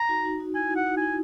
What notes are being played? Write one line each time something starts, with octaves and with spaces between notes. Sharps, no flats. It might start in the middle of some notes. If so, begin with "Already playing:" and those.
Already playing: A#5
D#4 F#4
D#4 F#4
D#4 F#4
E4 G#5
D#4 F#4
F#5
D#4 F#4
E4 G#5